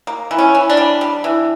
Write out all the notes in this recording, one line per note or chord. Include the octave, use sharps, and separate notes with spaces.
A#3
E3
C#4
E3
D4
G3
G3
E3